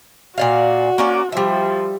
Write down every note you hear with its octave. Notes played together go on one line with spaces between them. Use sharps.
A#2 F#4 D5 F5
A#3 C#4 D5
F3 G3 E5